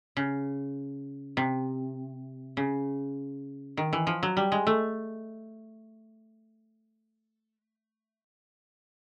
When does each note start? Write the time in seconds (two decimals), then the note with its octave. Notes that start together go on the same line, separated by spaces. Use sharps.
0.17 C#3
1.37 C3
2.57 C#3
3.77 D#3
3.93 E3
4.07 F3
4.23 F#3
4.37 G3
4.52 G#3
4.67 A3